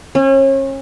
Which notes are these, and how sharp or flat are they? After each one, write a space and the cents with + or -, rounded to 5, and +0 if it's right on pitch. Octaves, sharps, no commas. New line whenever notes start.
C#4 -35